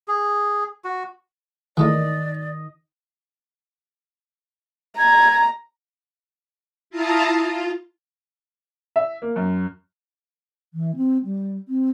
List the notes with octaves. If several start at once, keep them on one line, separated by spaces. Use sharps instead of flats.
G#4
F#4
D#3 E3 G#3 A3 D5 D#5 D#6
A#5 G#6
E4 F4 F5 A5 A#5 D#6
F4
E5
A#3
F#2
E3
C4
G3
C4